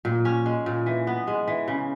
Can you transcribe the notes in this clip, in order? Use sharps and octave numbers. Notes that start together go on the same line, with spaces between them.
A#2
C#4
G#3
A#2
E3
B3
G#3
E3
C#3